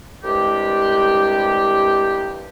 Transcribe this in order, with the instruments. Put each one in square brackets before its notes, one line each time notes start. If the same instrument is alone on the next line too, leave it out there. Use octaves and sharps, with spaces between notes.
[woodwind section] C2 G2 G#3 G4